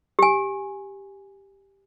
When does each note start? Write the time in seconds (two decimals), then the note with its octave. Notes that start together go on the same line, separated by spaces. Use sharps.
0.19 G4 G#5